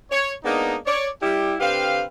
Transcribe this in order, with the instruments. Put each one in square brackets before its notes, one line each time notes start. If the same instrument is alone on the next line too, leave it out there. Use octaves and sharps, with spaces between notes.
[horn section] C#5
G#3 A#3 B3 D4 D#4
C#5 D5
G3 E4 G4
D3 C4 G4 B4 F5